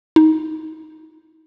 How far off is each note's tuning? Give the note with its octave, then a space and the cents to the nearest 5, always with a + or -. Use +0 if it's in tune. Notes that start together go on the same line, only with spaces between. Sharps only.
D#4 +15